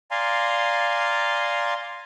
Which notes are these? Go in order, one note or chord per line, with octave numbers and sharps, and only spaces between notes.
D5 F5 G#5 A#5 C6